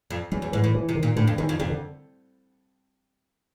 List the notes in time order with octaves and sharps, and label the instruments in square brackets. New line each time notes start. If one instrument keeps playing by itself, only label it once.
[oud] F2
[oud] E2 [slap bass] F#3
[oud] E2
[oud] G#2 [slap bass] E3
[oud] A2
[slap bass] E3
[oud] C3
[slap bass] D#3
[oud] A#2
[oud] A2 [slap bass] D3
[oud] F2
[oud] E2 [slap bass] D#3
[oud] F2
[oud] F2 [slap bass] C3
[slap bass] D3